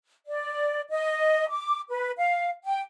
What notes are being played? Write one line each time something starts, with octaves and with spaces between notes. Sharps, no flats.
D5
D#5
D6
B4
F5
G5